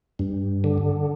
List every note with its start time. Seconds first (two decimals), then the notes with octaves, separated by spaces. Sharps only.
0.19 G2
0.64 D3